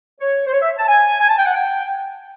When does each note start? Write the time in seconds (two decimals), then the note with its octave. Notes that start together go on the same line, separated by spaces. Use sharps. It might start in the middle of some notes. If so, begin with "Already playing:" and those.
0.20 C#5
0.47 C5
0.54 C#5
0.62 E5
0.78 A5
0.88 G#5
1.21 G#5
1.29 A5
1.38 G5
1.46 F#5
1.54 G5